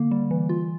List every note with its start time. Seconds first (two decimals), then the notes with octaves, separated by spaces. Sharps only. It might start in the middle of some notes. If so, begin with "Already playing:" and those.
Already playing: D3 A#3
0.11 G3
0.31 E3
0.49 F4